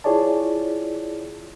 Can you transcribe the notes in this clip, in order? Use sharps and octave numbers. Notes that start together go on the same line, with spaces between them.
E4 F4 G#4 C#5 D5 A5